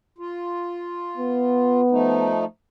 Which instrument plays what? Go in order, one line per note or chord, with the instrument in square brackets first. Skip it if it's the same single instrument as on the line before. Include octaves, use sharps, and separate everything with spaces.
[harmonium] F4
[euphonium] B3
[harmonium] F3 A3 D#4